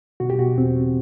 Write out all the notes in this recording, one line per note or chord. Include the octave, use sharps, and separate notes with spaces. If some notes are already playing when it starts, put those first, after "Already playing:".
B2 F#4
G4
B2 F#4
E2 C4
E2